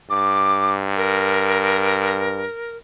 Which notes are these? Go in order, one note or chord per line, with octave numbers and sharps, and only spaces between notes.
G2 D6
A#4